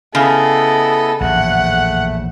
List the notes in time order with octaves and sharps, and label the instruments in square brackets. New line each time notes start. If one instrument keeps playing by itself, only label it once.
[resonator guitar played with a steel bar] C#3 [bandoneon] B3 E4 D#5 [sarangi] A4
[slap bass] A#1 E2 A2 [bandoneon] A3 [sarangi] F#5